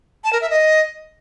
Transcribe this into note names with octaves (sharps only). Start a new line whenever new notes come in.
A5
A#4
E5
D#5